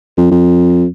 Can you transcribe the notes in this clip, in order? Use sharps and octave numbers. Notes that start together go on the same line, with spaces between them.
F2
F2